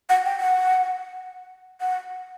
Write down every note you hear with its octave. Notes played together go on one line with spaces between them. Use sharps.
F#5
G5
F#5
F#5